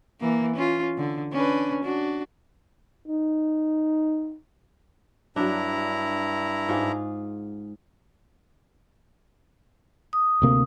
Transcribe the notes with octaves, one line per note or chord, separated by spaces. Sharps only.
E3 A#3
C#4 F4
D3
C#4 D4 B4
D4 F#4
D#4
G2 F#3 D4 E4 A#5
G#2 F4 G#4
D#6
D2 C3 A#3